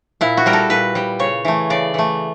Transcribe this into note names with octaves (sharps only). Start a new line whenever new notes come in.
A#2 E4
F#4
G3 A#4
A4
A#2 B4
G3
C#3 C#5
E3 A3
C#3 D5
E3 A3